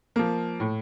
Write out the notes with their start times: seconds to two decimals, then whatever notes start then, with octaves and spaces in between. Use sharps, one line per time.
0.16 F3 A#3
0.60 A2